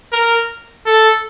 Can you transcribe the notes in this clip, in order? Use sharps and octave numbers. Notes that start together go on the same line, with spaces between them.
A#4
A4